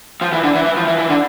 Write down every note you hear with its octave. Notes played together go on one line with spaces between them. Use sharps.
F3
E3
D3
E3
E3
F3
E3
E3
D3